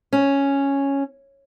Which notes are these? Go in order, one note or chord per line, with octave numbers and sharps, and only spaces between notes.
C#4